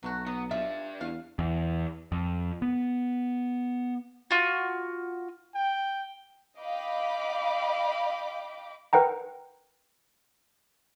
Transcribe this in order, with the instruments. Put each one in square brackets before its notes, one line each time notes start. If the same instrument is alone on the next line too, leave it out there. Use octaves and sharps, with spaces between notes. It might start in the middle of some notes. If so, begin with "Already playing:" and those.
[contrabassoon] B1 [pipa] F#3 A3 F#4
[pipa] F#3 [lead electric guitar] B3
[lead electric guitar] G3 D4 [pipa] F4 [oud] E5
[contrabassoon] E2 [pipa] F5
[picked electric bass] E2
F2
B3
[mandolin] F4 F#4
[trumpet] G5
[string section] D#5 F5 G5 B5 D6
[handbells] A#4 B4 F#5 G5 A#5